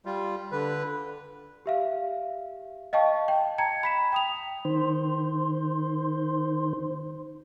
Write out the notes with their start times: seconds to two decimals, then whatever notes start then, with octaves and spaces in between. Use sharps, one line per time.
0.05 G3 F4
0.52 D3 B4
1.66 G4 E5 F5
2.93 D#5 F5 G5 A5 C#6
3.28 G5 A5
3.58 G5 A5 A#5 G#6 C#7
3.83 B5 B6 E7
4.12 G5 D#6 F7
4.65 D#3 C5